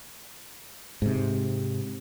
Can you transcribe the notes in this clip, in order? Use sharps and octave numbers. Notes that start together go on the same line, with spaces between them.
G#2 C3